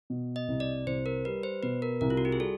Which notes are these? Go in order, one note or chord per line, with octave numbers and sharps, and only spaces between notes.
B2
D#5
C2
D5
C2 C5
A#4
G3 B4
C5
B2 B4
A#4
C2 A#4
F4
F#4
G4
G#4
G3 A4